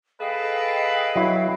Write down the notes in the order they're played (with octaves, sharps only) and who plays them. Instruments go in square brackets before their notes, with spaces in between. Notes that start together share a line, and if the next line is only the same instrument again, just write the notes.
[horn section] G#4 A4 B4 [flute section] D#5 F5 G5
[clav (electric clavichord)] F#3 E4